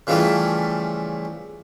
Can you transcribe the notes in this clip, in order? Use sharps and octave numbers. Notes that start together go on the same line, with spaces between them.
C#3 E3 F3 G3 A3